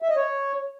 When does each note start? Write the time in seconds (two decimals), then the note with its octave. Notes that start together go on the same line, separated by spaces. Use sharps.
0.02 E5
0.09 D#5
0.16 C#5